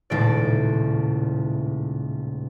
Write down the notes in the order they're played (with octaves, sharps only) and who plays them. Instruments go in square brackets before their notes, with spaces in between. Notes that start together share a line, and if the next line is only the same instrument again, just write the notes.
[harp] D#1 C#2 A2 D5